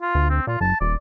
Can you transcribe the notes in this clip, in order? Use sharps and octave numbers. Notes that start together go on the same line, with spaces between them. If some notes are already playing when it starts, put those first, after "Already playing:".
F4
D2
C4
A#2 F4
F#1 A5
D#1 D5